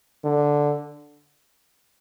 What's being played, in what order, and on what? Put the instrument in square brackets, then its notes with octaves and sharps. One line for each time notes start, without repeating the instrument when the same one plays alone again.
[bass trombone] D3